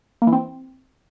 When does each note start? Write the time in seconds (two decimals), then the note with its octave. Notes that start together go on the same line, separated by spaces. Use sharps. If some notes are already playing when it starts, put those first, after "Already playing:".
0.22 A#3
0.27 E3
0.32 C4